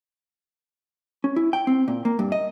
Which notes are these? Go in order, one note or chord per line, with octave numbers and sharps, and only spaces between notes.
C#4
E4
G5
C4
A#2
A#3
G2
D#5